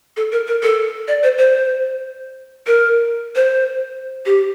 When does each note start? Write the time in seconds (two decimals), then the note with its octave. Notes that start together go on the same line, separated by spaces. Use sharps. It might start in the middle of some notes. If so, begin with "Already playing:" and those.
0.17 A4
0.32 A#4
0.47 A#4
0.63 A4
1.08 D5
1.23 C5
1.38 C5
2.67 A#4
3.35 C5
4.26 G4